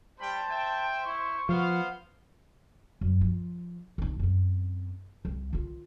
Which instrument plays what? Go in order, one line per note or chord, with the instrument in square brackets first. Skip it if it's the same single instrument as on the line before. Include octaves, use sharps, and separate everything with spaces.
[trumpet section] G3 G5 B5 [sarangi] C5 [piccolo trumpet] A5
[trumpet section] E5 G5
[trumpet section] E4 [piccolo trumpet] C#6
[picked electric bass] F3 [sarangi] B3 [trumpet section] C5 F5
[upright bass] F#2
F3
C2 D#4
F#2 C4
C2
D#3 F4